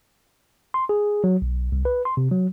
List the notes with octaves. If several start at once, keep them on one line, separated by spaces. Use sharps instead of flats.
C6
G#4
F#3
B1
C2
B4
C6
C3
F#3